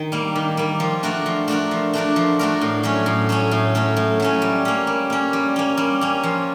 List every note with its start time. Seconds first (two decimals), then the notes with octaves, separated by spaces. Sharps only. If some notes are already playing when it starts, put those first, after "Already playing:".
Already playing: D#3
0.12 G3 A#3
0.36 D#3
0.57 G3 A#3
0.80 F3
1.03 A3 D4 F#4 A#4
1.26 F3
1.48 A3 D4 F#4 A#4
1.71 F3
1.94 A3 D4 F#4 A#4
2.16 F3
2.39 A3 D4 F#4 A#4
2.61 A2
2.83 F#3 A3 C#4
3.06 A2
3.29 F#3 A3 C#4
3.51 A2
3.75 F#3 A3 C#4
3.96 A2
4.20 F#3 A3 C#4
4.42 G3
4.65 A#3 C#4
4.87 G3
5.10 A#3 C#4
5.33 G3
5.56 A#3 C#4
5.77 G3
6.01 A#3 C#4
6.23 F3